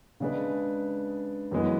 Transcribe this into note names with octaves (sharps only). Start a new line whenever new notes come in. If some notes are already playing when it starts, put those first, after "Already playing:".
C#3 G#3 D4 G#4 B4
F#2 E3 G#3 B3